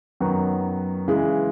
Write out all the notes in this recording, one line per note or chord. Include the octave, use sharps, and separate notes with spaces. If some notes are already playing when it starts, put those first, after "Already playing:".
F#2 D#3 F#3 B3 F#4
C#3 E3 G#3